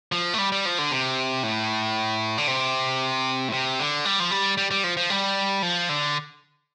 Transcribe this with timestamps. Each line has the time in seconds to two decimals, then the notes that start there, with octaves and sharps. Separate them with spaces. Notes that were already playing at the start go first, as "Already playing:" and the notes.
0.12 F3
0.34 A3
0.38 G3
0.52 G3
0.65 F3
0.78 D3
0.91 C3
1.43 A2
2.38 D3
2.48 C3
3.48 A2
3.53 C3
3.80 D3
4.05 G3
4.20 F3
4.31 G3
4.58 G3
4.71 G3
4.84 F3
4.97 F3
5.10 G3
5.62 F3
5.89 D3